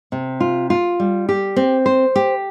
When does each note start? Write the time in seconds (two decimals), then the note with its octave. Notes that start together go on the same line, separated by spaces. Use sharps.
0.12 C3
0.40 F4
0.70 F4
1.00 G3
1.29 G4
1.56 C4
1.86 C5
2.16 G4